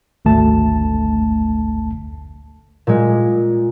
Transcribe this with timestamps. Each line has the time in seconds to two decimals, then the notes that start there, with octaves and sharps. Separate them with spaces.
0.25 G#1 D2 A3 A5
2.87 A#2 G#3